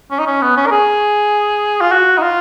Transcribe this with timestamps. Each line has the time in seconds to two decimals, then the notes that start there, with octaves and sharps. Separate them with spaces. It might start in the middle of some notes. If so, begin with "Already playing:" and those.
0.11 C#4
0.19 D#4
0.26 C#4
0.42 B3
0.57 C#4
0.67 A#4
0.71 G#4
1.81 F4
1.92 F#4
2.18 D#4
2.22 F4